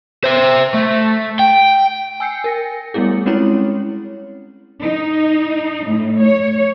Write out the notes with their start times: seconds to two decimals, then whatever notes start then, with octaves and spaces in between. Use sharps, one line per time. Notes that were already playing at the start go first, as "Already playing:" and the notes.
0.24 C5 E5
0.74 A3
1.39 G5
2.20 G#5 E6 G6 C7 C#7
2.44 A#4 A#6 C#7
2.94 G3 A3 B3 E4 G#4
3.26 G#3 C4 C#4 E4 C#5
4.82 D#4
5.86 A2
6.21 C#5